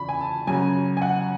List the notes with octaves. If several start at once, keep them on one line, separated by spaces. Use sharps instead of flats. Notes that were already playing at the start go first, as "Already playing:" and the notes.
Already playing: E2 C#3 B5 C#6
G#5
A5
F#2 C#3 F#3 G#5
G#5
F#5